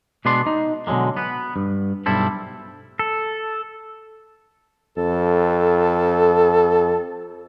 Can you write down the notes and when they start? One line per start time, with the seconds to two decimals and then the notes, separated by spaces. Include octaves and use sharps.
0.25 B2 G#3 B3 D4 D5 C6
0.46 D#4
0.87 B2 D3 F#3 G#3 A#3
1.17 B3 B4
1.56 G2
2.06 B1 G2 G3 E4 A4 C5
2.99 A4
4.97 F2 A4